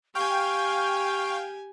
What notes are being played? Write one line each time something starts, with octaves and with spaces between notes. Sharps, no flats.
G4 F5 G5 G#5 C#6